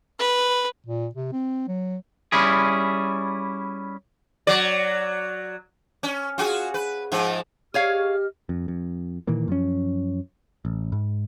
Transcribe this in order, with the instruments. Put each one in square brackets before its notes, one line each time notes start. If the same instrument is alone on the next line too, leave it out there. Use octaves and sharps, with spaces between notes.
[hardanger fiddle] B4
[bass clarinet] A#2
C3
C4
F#3
[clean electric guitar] G3 C#4 E4 G#4
[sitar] F#3 D5
C#4
F4 F#4 G#4
B4
G#2 F3
[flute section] G4 D#5 F6 [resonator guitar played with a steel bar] G#4 C#5 F5
[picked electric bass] F2
F2
A#2 D#3 E3 A#3
F#2 F3 C#4
A1
G#2